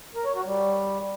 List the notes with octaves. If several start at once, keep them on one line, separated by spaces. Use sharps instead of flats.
A#4
C#5
F#4
G3